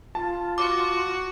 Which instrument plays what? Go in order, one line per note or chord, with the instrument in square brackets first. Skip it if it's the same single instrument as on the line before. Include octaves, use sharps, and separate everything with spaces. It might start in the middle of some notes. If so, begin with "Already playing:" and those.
[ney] F4 [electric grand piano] A5
[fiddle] F#4 [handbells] D6